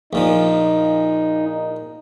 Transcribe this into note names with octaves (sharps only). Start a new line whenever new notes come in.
A#1 A#2 F3 D#4